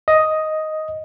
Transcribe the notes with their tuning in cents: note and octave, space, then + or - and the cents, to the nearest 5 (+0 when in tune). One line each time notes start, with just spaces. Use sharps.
D#5 +5